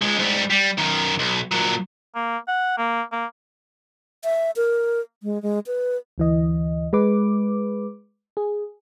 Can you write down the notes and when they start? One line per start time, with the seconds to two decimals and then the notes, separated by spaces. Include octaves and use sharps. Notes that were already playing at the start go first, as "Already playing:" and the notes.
0.02 C#2 G#3
0.19 G#2 G3
0.50 G3
0.78 F#2 D#3
1.19 B1
1.52 A#2 F#3
2.15 A#3
2.48 F#5
2.77 A#3
3.12 A#3
4.24 E5
4.56 A#4
5.23 G#3
5.42 G#3
5.67 B4
6.18 D2 E3 D#5
6.93 G#3 B4 D6
8.37 G#4